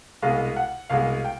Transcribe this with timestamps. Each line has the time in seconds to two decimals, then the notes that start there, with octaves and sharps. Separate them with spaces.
0.22 C2 B2 G#3 F5
0.56 F#5
0.90 C2 B2 G#3 F5
1.25 G5